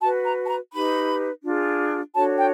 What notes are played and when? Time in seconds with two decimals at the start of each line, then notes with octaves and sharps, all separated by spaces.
0.01 F#4 B4 A5
0.25 A#5
0.45 A5
0.49 A#5
0.73 D#4 G4 B4 B5
1.43 D4 F4 G#4
2.14 D4 F#4 A4 C#5 A5
2.38 G5